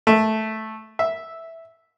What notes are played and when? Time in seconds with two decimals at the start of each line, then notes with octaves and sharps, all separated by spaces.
0.07 A3
0.99 E5